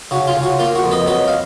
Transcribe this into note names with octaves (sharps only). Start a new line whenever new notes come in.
C#3 F#4
F4
C#3
F#4
A#3 F4
F#4
F2
B4 D#5
F#3 B4 D#5
F5